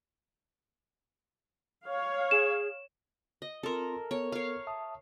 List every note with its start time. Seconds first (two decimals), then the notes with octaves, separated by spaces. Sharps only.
1.85 C#5 F5
2.31 G#4 E7
3.42 D#5
3.63 C4 F4 A4 A#4 C6
4.11 B3 A4 A#4 C#5
4.32 C#5 F5
4.67 E5 A5 D#6